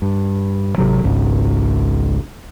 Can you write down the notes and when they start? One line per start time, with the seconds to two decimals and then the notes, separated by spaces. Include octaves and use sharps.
0.02 G2
0.78 G#1 C3 F#3
1.03 G#1 C#2 G#2